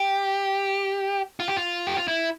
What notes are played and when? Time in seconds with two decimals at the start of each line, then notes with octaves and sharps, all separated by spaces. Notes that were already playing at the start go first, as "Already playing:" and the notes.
Already playing: G4
1.40 F4
1.48 G4
1.57 F4
1.87 G4
1.97 F4
2.08 E4